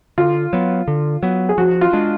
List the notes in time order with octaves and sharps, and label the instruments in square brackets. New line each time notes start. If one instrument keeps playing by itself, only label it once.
[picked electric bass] D3 [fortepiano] F4
[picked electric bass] F#3 B3
D3
F#3 B3
[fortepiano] G#4
[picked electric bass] F3 [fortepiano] F#4
[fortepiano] F4
[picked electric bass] G#3 D4